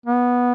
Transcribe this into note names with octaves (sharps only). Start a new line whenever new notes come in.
B3